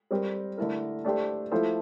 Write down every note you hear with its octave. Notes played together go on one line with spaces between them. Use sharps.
G3 C4 G4 A#4
D3 A3 E4 A#4
A3 D4 G4 C5
F3 A3 E4 A4 C5